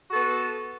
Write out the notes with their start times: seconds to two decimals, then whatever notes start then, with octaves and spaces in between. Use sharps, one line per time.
0.08 F#4
0.11 A4
0.15 B3